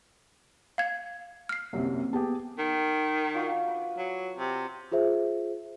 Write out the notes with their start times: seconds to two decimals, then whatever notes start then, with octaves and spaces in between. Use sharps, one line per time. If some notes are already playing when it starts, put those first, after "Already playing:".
0.78 F5 G#6
1.49 F6 C7
1.73 C2 F#2 C3 A#3 C4
2.13 B3 G4 G#4 A5
2.58 D#3
3.34 D4 F4 F#4
3.68 B4
3.98 F#3
4.38 C3
4.92 F4 G#4 C5 E5